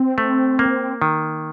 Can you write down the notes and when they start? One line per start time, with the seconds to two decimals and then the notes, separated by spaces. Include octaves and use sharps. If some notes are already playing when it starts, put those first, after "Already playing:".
Already playing: C4
0.18 A3
0.59 A#3
1.02 D#3